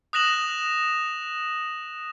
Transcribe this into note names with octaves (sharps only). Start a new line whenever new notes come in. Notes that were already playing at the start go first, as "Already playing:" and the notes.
D#6 F#6 A#6 E7 F#7